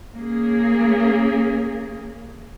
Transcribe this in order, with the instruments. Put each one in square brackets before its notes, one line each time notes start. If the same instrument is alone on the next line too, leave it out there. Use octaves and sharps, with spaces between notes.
[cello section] A#3 C#4 G#4